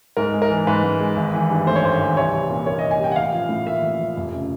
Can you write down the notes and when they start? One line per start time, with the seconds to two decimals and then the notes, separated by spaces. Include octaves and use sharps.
0.17 G#2 A#4
0.33 G#3
0.42 A#4
0.50 E3
0.67 G#2 B4
0.84 G#2
1.00 G#3
1.16 G#1
1.34 E3
1.50 G2
1.67 A3 C5
1.76 C#5
1.83 G#1 C5
2.00 E3
2.17 C2 C#5
2.33 G3
2.50 A#2
2.66 A#3 C#5
2.79 C2 D#5
2.91 G#5
2.99 G3 G5
3.12 F#5
3.16 A1 F5
3.32 F3
3.49 A2
3.66 A#3 E5
3.83 A1
3.99 F3
4.16 F1
4.33 C#3